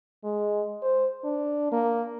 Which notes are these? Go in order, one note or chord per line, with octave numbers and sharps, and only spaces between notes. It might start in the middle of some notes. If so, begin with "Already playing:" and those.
G#3
C5
D4
A#3